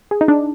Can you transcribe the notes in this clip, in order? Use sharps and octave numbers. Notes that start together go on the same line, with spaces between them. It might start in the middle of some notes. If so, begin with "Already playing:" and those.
G#4
D#4
D4